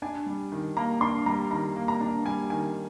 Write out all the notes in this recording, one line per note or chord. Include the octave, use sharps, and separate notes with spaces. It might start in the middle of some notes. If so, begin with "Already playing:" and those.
D4 G#5
G3
D#3
A#3 A#5
D4 C6
G3 A#5
D#3 A#5
A#3
A#5
D4
G3 G#5
D#3 G#5